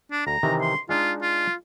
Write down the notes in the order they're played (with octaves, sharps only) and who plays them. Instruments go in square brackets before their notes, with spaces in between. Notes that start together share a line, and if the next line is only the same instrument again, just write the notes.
[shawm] D4
[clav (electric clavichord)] D2 [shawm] A#5
[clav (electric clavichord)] C3 D#3 E3
[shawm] C6
[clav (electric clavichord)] G#3 D4 D#4 [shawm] F4
[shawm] F4